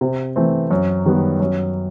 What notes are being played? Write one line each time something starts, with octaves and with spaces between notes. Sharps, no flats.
C3
E3 A3 C4
F#2
D#3 G3 B3
F#2